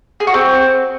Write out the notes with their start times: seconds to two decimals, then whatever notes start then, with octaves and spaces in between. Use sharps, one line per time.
0.20 G#4
0.27 F#4
0.34 C4